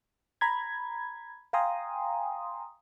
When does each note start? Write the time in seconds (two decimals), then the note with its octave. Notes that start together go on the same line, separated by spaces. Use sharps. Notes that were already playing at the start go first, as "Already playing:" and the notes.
0.41 A#5 B5 G#6
1.53 F5 G5 G#5 A#5 C6 D#6